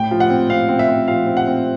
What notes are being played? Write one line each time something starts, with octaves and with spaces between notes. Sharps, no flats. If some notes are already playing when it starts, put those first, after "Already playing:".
Already playing: A2 G5
F3
F#5
C4
C4 F5
C4
E5
C4
F3 F5
C4
F#5
C4